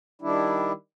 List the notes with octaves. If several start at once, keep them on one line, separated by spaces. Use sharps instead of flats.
D#3 G3 D4 E4